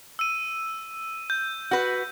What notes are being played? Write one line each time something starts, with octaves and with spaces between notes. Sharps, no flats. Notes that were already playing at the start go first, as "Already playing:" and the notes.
E6 D#7
G6
F#4 B4